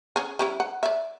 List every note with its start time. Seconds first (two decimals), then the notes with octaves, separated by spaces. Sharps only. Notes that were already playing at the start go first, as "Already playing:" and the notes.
0.16 C#4 G#4
0.39 G3 C#4 E4
0.60 F#5
0.83 D5 E5